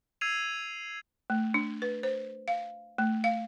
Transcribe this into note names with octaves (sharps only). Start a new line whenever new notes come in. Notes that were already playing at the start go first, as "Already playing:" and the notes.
E6 G#6 C7 D#7 F7
A3
D4
B4
C5
F5
A3
F5